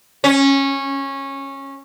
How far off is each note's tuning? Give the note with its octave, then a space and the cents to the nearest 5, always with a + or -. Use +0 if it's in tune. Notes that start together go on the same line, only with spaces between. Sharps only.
C#4 -15